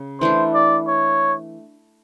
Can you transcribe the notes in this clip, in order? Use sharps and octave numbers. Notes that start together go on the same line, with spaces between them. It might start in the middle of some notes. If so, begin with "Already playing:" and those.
Already playing: C#3
E3 A3 D4 C5
D5
C#5